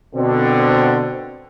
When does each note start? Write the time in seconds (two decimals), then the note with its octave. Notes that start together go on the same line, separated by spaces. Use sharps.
0.15 B2 D3 C4